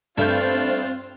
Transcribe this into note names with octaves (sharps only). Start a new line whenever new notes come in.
G2 A3 C4 D4 F4 C5 E5 G6